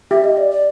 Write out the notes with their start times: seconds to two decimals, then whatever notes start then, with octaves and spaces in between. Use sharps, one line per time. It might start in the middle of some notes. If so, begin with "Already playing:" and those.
0.11 G4 E5
0.24 D#5
0.37 D5
0.51 D5